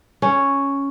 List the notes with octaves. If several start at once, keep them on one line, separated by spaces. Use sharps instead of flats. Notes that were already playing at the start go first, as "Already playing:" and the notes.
C#4